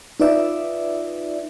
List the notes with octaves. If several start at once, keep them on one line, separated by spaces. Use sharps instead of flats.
D#4 F4 B4 D5 E5